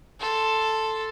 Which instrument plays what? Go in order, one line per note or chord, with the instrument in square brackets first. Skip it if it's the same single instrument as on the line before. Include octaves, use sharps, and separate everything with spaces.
[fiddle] A4 C6